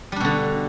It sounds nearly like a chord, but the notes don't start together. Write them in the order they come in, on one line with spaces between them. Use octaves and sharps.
G3 D4 B2 D3